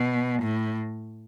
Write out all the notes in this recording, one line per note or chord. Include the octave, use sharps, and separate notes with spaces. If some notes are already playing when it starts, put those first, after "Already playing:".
Already playing: B2
A2